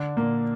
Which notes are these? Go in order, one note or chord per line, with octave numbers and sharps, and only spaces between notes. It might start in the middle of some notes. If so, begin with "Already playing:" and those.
Already playing: D3 D4
A#2 A#3